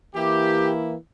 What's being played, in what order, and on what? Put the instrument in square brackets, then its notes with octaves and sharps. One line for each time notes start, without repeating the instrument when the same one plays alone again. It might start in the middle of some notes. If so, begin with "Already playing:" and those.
[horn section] E3 A#3 E4 G4